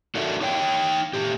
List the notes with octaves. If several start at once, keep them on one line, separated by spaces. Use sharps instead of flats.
D4 D#4 F#4 A4 A#4 E5
D#4 C#5 F5 G5
A#2 G4